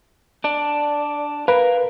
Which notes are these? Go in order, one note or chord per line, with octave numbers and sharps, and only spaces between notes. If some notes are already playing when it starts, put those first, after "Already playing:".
D4 D5
A#4 B4 F5